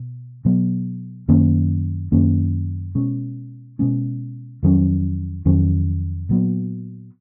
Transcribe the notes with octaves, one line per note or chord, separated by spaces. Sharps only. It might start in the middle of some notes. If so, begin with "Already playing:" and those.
Already playing: B2
B2 F#3 B3
F#2 D#3 A#3 C#4
F#2 D#3 A#3 C#4
B2 G#3 C#4
B2 G#3 C#4
F2 D#3 F#3 C#4
F2 D#3 F#3 C#4
A#2 F#3 B3